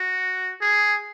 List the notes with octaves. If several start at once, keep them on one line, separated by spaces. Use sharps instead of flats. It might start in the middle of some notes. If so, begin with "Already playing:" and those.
Already playing: F#4
G#4